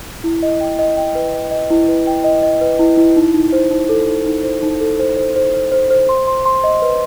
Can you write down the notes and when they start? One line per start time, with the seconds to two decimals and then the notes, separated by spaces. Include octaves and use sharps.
0.24 E4
0.43 D#5
0.61 G5
0.79 D#5
0.97 G5
1.15 B4
1.34 D#5
1.51 D#5
1.70 E4
1.88 B4
2.07 G5
2.24 D#5
2.43 D#5
2.61 B4
2.79 E4
2.97 E4
3.17 D#4
3.34 D#4
3.53 C5
3.71 D#4
3.89 A4
4.07 D#4
4.26 D#4
4.44 C5
4.63 D#4
4.81 A4
4.99 C5
5.17 C5
5.36 C5
5.54 C5
5.72 C5
5.90 C5
6.09 C6
6.27 C6
6.46 C6
6.64 D#5
6.82 B4